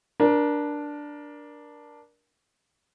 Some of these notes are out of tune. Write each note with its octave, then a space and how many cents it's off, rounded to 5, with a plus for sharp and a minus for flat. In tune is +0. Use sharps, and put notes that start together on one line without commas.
D4 +0 A#4 +25